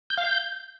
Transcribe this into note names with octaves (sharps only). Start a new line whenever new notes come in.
G6
F5
G6